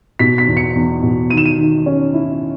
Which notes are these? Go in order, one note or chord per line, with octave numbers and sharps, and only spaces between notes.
B2 B6
B6
E2
C#7
E2
B2
D#3 D#7
E7
D#7
D#3
C#4
E4